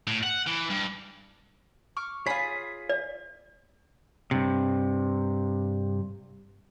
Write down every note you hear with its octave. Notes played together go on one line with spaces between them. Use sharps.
A2
F#5
E3
G2
C#6 D6 F6
F4 G#4 C#5 B5 B6
D5
G2 C3